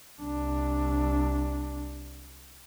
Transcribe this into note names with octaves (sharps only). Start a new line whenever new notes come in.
C2 D4